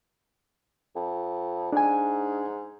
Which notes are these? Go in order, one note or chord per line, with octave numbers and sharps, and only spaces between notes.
F2
G#2 D4 G#5